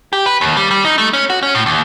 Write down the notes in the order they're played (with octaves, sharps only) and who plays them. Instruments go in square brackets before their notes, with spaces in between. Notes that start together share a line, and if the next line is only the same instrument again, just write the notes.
[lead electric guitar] G4
B4
D#2
G3
G3
D#4
A3
C#4
F#4
C#4
A2
D#2